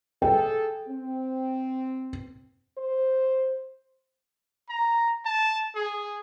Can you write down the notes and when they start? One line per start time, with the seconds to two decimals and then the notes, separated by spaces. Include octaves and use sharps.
0.22 G#4 A4 G5
0.88 C4
2.78 C5
4.69 A#5
5.25 A5
5.76 G#4